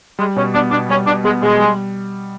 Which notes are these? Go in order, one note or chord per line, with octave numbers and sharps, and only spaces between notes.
G3 G#3
B2 C#4
B3 D4
B2 D4
G3 C#4
B2 D4
G#3 B3
B2 G#3
G3